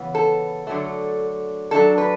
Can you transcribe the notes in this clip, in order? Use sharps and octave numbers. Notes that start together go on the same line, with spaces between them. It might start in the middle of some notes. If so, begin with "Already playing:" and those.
Already playing: C#3 E3 B3
A4
D3 F#3 A3
F#3 A3 D4 A4
B4